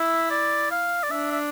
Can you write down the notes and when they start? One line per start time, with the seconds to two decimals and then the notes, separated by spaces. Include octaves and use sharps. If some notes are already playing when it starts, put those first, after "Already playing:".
Already playing: E4 E5
0.31 D5
0.71 F5
1.03 D5
1.11 D4 E5
1.31 E5